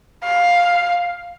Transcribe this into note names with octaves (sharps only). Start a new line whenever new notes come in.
F5